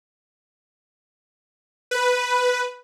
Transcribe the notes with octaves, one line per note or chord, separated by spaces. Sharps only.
B4